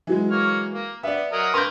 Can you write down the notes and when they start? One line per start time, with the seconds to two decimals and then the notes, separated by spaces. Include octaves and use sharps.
0.07 E3 F#3 G#3
0.31 A#3 C#5 F6
0.74 A#3
1.03 B3 D5 E5
1.32 F#3 A#4 D#5
1.54 A#3 A#4 B4 C6 G6